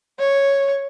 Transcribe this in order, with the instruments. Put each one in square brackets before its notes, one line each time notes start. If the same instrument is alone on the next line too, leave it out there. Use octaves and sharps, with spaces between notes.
[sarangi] C#5